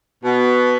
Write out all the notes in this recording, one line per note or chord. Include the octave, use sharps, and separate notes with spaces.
B2